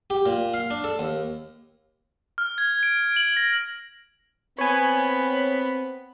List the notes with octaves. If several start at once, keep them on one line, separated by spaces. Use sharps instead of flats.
G4
A#2
F5
D4
A4
D#2
F6
G#6
D7
F#7
A#6
B3 C4 C#5 G#5 B5